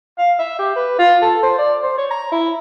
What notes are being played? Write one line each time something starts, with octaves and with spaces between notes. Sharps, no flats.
F5
E5
G4
B4
F4
A4
C5
D5
C5
C#5
A#5
E4